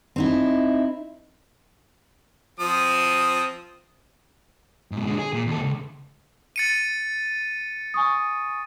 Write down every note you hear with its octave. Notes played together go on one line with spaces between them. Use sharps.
C4 D#4 E4
F3 C4 D#6
G#2 B2
D3 G#3
G#4
A#2
D#2 A4
C#2
A6 C#7 D#7
G#5 C#6 D#6